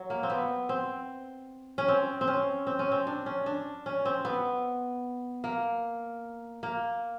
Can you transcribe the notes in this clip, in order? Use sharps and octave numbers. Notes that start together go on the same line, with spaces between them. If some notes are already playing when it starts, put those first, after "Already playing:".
Already playing: F#3
A#3
C4
B3
C4
C#4
C4
C4
C#4
C4
C#4
C4
D4
C#4
D4
C#4
C4
B3
A#3
A#3